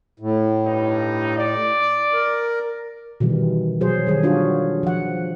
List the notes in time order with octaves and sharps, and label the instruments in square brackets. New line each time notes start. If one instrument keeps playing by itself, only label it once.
[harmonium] A2
[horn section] G2 D#4
D5
[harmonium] A#4
[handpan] B2 D#3 E3 G3
B2 F#3 G#4 C5
D#3 G3 G#4
D4 F4 F#4 C#5
F3 F#5